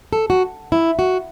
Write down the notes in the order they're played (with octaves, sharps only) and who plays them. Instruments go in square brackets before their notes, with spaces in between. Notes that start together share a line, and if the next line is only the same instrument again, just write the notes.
[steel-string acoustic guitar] A4
F#4
E4
F#4